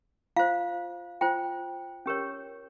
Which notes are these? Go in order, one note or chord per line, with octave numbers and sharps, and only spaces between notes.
F4 C5 F5
F4 C5 G5
C#4 G4 A#4 C#5